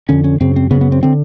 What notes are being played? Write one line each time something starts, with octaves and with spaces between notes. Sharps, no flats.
F2 D3 C#4
C#4
F#2 C#3 C4
C4
F#2 C#3 B3
B3
C4
D3 C4